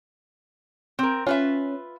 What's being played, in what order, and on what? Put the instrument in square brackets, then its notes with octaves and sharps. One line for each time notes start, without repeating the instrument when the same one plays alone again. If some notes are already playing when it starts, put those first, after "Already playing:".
[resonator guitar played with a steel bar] C4 A#4
[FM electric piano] C#4 [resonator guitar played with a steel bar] F4 B4 E5